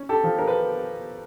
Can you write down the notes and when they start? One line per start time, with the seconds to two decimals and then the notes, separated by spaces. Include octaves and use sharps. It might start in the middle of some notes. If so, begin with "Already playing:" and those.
Already playing: C#4
0.09 G4 A4
0.24 F3
0.38 A#4
0.47 B4